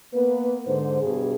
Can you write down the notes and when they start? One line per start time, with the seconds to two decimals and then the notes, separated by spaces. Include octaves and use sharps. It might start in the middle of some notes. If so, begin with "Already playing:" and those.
0.14 A#3 B3 B4
0.67 G#2 D3 C5
1.02 G2 B2 G#4